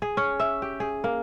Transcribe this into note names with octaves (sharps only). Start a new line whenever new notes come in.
G#4
C#4
E5
G4
G#4
A#3